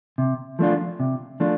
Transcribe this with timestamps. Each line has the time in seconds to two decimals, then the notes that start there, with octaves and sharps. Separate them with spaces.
0.18 C3
0.59 F3 A3 D4 F4
1.00 C3
1.40 F3 A3 D4 F4